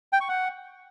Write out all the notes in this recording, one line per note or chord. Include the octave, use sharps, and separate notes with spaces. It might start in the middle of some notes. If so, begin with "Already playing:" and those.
G5
C#6
F#5